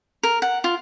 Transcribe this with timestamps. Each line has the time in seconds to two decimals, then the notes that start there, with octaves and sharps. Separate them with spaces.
0.23 A#4
0.42 F#5
0.64 F4